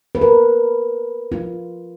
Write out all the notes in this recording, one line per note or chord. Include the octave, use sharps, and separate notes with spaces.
B4
A#4
F4